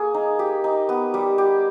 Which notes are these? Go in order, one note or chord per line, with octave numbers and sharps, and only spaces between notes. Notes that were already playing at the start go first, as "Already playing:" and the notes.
Already playing: A#3 G#4
D#4
G4
D#4
B3
G3
G4